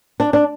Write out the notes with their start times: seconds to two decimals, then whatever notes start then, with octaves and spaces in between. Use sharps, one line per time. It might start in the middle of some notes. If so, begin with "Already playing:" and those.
0.20 D4
0.33 D4